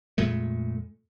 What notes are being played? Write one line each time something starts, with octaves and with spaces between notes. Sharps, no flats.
F2 A#2 G#3 A3